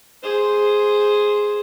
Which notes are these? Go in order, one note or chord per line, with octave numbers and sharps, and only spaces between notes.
G#4 C5